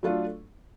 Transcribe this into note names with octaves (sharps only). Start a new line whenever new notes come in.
F#3 A3 D4 F4 A4